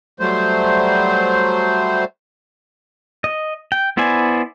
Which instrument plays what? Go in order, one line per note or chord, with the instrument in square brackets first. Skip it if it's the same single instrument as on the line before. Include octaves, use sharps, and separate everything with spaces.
[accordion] F#3 G3 A3 C5
[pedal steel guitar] D#5
G5
B3 E4 C5 D5 G#5